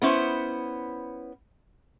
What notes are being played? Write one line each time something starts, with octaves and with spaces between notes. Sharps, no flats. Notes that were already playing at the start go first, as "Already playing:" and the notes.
B3 C#4 E4 C5